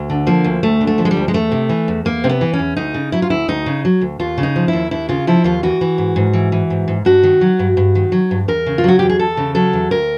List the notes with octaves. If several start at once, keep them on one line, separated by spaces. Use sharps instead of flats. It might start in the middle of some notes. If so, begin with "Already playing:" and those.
Already playing: D2
D3
F3 A#3
D2
D2 A3
D3
A3
F3
G#3
G3
D2
G#3
E2 A3
C3
E3
E2
E2 A#3
C3 C4
B3
E3
C#4
E2
D2 D#4
C#3
F#3 E4
F4
D2 E4
D2 D#4
C#3
F#3
D2
D#2 F4
C#3
D#4
F3
E4
D#2
D#2 E4
C#3 F4
F3 E4
D#2 F4
E3 F#4
E3
G#2
G#2
E3
E3
G#2
G#2
G2 F#4
D#3
F#3
G2
G2
D#3
F#3
G2
E2 A#4
C#3
F4
F#3 F#4
E2 G4
G#4
E2 A4
C#3
F#3 A4
E2
D2 A#4